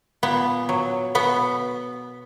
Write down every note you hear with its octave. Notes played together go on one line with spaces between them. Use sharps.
A#2 B3
F#3
B2 B3